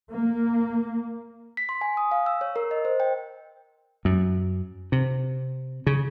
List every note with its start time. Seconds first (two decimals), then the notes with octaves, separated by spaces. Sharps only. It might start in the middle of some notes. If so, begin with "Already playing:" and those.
0.11 A#3
1.57 B6
1.69 C6
1.81 G#5
1.97 D#6
2.11 F5
2.26 E6
2.41 C#5
2.56 A#4
2.71 D#5
2.85 C5
3.00 G5
4.05 F#2
4.92 C3
5.87 C#3